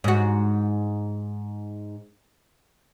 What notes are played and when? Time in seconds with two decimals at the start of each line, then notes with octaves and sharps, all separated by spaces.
0.04 G#2 F#4